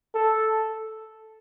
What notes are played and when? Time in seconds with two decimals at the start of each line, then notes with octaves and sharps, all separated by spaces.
0.15 A4